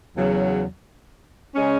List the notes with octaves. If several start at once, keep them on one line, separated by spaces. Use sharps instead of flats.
E2 C#3 F#3
C#3 G#3 C#4